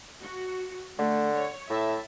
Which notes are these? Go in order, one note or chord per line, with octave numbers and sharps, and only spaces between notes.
F#4
D3 A3
C#5
A2 E5 A5